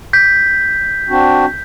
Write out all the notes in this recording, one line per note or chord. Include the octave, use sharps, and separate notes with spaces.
G6 B6
C4 D4 F#4